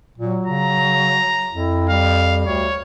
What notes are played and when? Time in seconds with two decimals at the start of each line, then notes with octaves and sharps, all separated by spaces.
0.18 A#2 F#3
0.47 C#3 A#5
1.52 F2 E4
1.90 G3 F5
2.47 D2 C#5